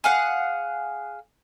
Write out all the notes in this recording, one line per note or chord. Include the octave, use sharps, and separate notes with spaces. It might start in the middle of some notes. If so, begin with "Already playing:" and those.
G#4 F5 F#5